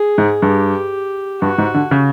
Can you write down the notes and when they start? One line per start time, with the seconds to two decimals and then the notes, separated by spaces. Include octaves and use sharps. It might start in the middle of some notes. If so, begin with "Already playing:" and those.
Already playing: G#4
0.18 G#2
0.42 G2 G4
1.41 G2 F#4
1.58 G#2
1.74 D3
1.91 C#3